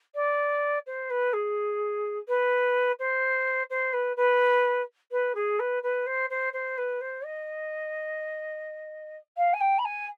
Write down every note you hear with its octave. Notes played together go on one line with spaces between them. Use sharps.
D5
C5
B4
G#4
B4
C5
C5
B4
B4
B4
G#4
B4
B4
C5
C5
C5
B4
C5
D#5
F5
G#5
G5
B5
G#5